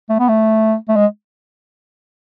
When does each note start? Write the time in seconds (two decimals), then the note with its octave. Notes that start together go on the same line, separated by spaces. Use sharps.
0.09 A3
0.19 B3
0.28 A3
0.88 A3
0.96 G#3